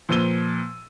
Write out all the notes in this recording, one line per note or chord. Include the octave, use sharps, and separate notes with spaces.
A#2 F3 B4 E6 D#7 G7